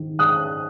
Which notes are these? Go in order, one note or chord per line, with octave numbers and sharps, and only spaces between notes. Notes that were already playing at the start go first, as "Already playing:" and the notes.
Already playing: G#2 D#3
G#2 D#6 F#6